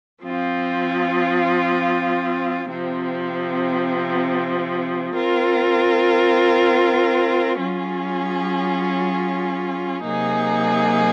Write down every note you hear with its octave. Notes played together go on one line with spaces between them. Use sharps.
F3 C4 F4
C3 F3 C4
C4 F4 A#4
F#3 C#4 F4 G#4
C3 F#3 A#3 D#4 G#4